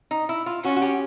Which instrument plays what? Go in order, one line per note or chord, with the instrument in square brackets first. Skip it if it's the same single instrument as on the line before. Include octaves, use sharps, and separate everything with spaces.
[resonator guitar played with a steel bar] D#4
E4
F4
[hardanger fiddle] C#4 [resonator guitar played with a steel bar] F#4
[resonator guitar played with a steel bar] F#4
G4